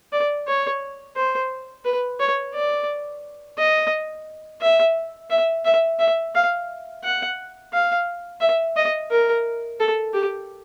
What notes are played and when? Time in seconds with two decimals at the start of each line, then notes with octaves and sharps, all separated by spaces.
0.12 D5
0.47 C#5
1.16 C5
1.85 B4
2.20 C#5
2.54 D5
3.58 D#5
4.61 E5
5.30 E5
5.65 E5
5.99 E5
6.35 F5
7.04 F#5
7.73 F5
8.41 E5
8.77 D#5
9.11 A#4
9.80 A4
10.14 G4